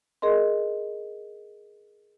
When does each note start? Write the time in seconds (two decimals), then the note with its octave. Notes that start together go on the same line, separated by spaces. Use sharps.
0.22 G#4 A#4 D#5 C6